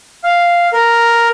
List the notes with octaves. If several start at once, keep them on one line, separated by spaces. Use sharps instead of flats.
F5
A#4